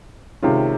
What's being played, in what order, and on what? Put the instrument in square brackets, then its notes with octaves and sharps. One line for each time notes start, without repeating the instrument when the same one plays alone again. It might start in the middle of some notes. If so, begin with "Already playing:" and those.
[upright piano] C3 D#3 G#3 C#4 F4